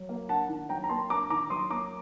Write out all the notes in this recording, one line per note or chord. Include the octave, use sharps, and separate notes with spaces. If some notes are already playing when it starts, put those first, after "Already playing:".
Already playing: F#3
A#3
D4 F#5 A5
D#3
F#3 G5 A#5
A#5
A#3 A5 C6
D4 A#5 D6
D#3 A#5 D6
F#3 C6 D#6
A#3 A#5 D6